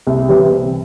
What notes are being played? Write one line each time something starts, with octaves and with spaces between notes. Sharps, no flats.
C2
C3 E3 G3 C4
C2